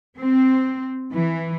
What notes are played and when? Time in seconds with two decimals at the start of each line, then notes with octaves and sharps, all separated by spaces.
0.17 C4
1.13 E3